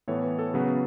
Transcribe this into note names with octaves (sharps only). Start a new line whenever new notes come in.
A2 E3 B3 A4 C#5
B4
A4
C#3 F#3 B3 B4